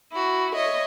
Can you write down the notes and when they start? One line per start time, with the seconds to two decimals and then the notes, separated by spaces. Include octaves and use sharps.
0.12 E4 F#4
0.54 C#5 D#5 E5